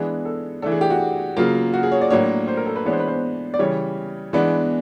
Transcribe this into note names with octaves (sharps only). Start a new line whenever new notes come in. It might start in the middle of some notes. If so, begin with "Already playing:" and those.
Already playing: E3 G#3 B3 D4 G#4
A4
E3 A3 D4 A4
G#4
G4
F#4
C#3 F#3 A#3 F4
F#4
G#4
C#5
D5
A2 F#3 A#3 D4 C#5
C5
A#4
A4
B4
E3 G#3 B3 D4 C#5
C5
B4
C5
D5
C#3 E3 G3 C#5
E3 G#3 B3 D4